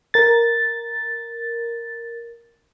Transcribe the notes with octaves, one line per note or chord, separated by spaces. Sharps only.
A#4 A6